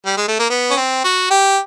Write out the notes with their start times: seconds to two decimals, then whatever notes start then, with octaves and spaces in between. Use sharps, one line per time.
0.06 G3
0.17 G#3
0.28 A3
0.39 A#3
0.50 B3
0.71 C#4
0.77 C4
1.04 F#4
1.30 G4